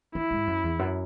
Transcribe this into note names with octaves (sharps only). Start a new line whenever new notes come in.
E3 E4
G#2
F#2
E2
F#2